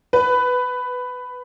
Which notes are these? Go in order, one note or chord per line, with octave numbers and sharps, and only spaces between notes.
B4